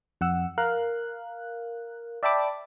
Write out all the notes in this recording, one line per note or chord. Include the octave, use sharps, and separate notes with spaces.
F2 F#5 E6
A#4 F5 F#6
D5 E5 G5 A5 B5 D6